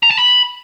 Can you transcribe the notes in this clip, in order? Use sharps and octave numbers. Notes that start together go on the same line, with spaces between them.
A#5
A5
B5